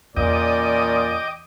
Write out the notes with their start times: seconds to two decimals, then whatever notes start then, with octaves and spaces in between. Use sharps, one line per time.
0.16 E2 A#2 C#4 D5 D#5 G5 D6 D#6